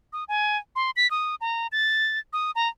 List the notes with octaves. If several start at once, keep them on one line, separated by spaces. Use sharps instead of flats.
D#6
G#5
C6
B6
D#6
A#5
A6
D#6
A#5